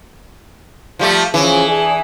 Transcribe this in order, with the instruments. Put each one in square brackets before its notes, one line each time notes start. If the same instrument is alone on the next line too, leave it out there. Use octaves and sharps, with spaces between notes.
[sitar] F3 G3 A3
[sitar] E3 [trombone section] F3 C#4 G#4
[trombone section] D4 G#4